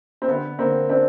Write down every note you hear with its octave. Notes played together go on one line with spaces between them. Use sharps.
C4
D3 B3
D3 A#3 C4
C4 D4